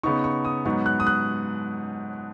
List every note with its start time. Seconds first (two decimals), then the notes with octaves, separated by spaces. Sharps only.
0.03 C#3 B3 D#4 C#6
0.24 C#6
0.45 D#6
0.65 G#2 F#3 B3 D#4 C#6
0.86 F#6
1.00 D#6
1.07 F#6